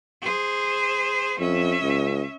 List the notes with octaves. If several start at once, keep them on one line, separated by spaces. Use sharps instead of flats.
G#4 C5
F2 C#4 E5
C#2